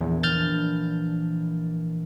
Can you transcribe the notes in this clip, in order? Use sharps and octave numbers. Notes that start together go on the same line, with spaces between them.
A#1 E2
E3 D4 F6 G6 A6